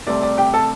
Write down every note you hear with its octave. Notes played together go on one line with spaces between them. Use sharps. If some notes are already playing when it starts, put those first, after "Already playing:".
C2 C3 A3 C4 D5
D5
G4 G5
A4 A5